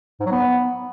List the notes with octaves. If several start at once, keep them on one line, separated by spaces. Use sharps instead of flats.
G#2
F#3
B3